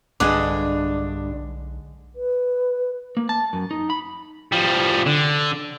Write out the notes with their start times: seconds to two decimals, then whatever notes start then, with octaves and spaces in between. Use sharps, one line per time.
0.20 B1 G2 D3 G#3 D4 G#4 D6 F#6
2.15 B4
3.17 A#3
3.29 A5
3.53 F#2
3.71 D#4
3.90 B5
4.52 F3 G3
5.06 D3